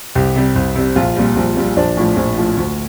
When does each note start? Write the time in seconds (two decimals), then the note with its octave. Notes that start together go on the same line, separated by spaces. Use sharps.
0.15 C2 G4
0.36 C3 G3
0.56 C2
0.75 C3 G3
0.96 A#1 F4
1.16 A#2 G3
1.36 A#1
1.57 A#2 G3
1.76 A#1 D4
1.97 A2 F3
2.16 A#1
2.37 A2 F3
2.57 D2